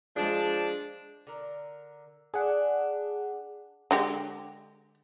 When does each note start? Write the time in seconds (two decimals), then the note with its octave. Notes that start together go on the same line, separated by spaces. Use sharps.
0.16 F3 G#3 D4 G#4
1.27 D3 A#4
2.34 D4 G#4 F#5
3.91 D3 G#3 G4